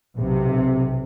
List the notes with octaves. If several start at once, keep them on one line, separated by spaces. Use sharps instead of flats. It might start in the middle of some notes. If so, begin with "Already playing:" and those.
B1 C3